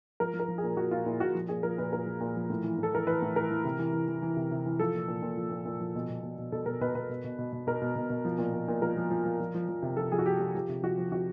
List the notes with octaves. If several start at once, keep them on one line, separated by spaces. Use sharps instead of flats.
F3 A#4
F3
A#4
F3
G#4
A#2
F3 F#4
A#2 F4
A#2 E4
A#2 F#4
F3
A#2 G#4
F3 A#4
A#2 B4
A#2 A#4
F3
A#2
F3
A2
E3
A2 A4
E3 A#4
E3 B4
A2
E3 A#4
E3
C3
E3
E3
E3
E3
C3
C3
E3
F3 A4
A#2
A#2
A#2
F3
A#2
A#2
F3
B2
B2
B2
B2
B2 A4
B2 A#4
B2 B4
B2 B4
B2
B2
B2
B2
B2 A#4
B2
B2
B2
F3
A#2
A#2
A#2
F3 A#4
F3
F3
F3
F3
F3
F3
C3
F3 A4
F3 G#4
F#4
F3 G4
F3 G4
F3 G4
C3
F3 F#4
F3
C3 F#4